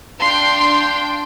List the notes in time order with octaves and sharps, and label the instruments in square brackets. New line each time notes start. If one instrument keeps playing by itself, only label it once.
[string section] D4 G5 [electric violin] F5 C6